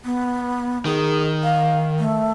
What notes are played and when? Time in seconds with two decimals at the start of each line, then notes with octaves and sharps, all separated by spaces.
0.05 B3
0.85 D#3 G#4
1.43 F5
1.99 A3